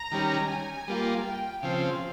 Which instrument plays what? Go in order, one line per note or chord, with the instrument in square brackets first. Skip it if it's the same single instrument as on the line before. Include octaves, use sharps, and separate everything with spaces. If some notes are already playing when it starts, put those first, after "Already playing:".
Already playing: [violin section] A#5
[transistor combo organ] D#3 G3 C#4
[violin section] G#5
[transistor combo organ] G3 A#3 F4
[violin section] G5
[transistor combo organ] C#3 F3 C4 [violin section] F5